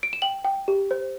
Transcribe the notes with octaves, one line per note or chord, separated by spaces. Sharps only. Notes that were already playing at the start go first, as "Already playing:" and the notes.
D7
E7
G5 F#7
G5
G4
C5